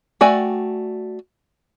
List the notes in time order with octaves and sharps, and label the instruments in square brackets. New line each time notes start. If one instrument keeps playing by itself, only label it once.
[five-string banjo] A3 F#4 D5 G5 G#5